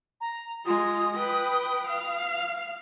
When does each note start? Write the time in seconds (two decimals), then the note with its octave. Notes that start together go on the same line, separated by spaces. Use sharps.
0.20 A#5
0.65 G#3 F4 D#6
1.15 B4 G5
1.87 F5